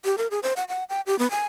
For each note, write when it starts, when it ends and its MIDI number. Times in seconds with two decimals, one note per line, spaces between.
0.05 0.16 67
0.18 0.27 70
0.31 0.40 68
0.43 0.53 72
0.56 0.64 78
0.68 0.84 78
0.89 1.01 79
1.06 1.18 67
1.19 1.29 59
1.31 1.46 80